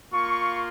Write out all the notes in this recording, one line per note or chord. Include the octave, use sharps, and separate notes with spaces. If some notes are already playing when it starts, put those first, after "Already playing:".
A#3 F4 C#6